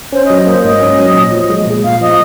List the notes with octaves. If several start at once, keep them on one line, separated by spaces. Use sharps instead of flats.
C#4 C5
D#5
F#3
D#5
A#3 C5
G#2 D#5
C#4
F#3
A#2
F3
G#3
A#2
A#2 F5
F3 D#5